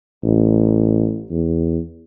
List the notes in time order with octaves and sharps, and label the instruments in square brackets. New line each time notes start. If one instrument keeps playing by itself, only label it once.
[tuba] A1
E2